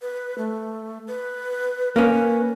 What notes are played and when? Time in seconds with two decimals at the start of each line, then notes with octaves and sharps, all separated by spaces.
0.02 B4
0.38 A3
1.08 B4
1.96 A#3 C#4 B4